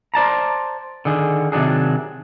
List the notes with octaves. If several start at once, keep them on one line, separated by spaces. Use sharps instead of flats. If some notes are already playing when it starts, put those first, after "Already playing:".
C5 D5 A5 A#5
D3 D#3 G#4
C3 D#3 F#3 D4 G#4